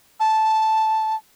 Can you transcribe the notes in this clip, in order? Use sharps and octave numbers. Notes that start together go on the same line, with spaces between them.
A5